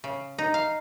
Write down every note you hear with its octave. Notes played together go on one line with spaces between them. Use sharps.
C#3
D#4
F5